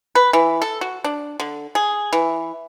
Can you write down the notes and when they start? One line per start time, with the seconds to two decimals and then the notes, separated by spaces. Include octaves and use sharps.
0.15 B4
0.33 E3
0.62 A4
0.81 F#4
1.04 D4
1.40 D3
1.75 G#4
2.13 E3